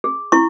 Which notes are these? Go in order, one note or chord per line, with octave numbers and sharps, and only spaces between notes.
G#4
E4 C#6